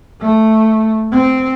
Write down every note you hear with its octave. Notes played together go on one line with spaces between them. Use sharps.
A3
C4